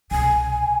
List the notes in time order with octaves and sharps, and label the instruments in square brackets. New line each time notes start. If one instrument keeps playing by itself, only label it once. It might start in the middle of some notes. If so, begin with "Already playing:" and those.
[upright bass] C2 B2 [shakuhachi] G#5